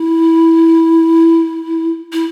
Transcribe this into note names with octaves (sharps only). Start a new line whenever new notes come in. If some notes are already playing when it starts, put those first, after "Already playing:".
Already playing: E4
E4